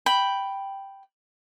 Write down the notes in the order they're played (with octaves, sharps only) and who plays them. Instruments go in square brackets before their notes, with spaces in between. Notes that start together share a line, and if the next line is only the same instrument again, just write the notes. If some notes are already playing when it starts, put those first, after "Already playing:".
[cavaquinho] G5 B5